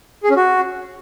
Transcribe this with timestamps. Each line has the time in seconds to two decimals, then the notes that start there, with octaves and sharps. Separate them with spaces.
0.23 G#4
0.30 C#4
0.37 F#4